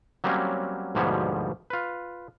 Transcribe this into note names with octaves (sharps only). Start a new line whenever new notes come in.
F#3 G3 A#3 C4 C#4
D2 G#2 B2 F3 G3 C#5
F4 B4